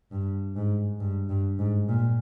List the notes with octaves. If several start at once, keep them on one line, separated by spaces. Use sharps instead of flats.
G2
G#2
G2
G2
G#2
A#2